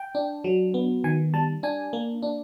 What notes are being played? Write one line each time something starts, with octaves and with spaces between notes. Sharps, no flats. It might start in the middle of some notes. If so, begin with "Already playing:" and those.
Already playing: G5
D4
F#3
B3
D#3 G#5
G3 A5
D4 G#5
A#3
D4